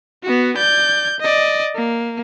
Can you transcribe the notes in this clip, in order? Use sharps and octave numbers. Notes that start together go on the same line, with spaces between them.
B3 F#4
D5 G6
D5 D#5
A#3